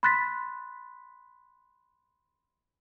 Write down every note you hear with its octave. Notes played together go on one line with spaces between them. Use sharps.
B5 C6 F#6 A6 B6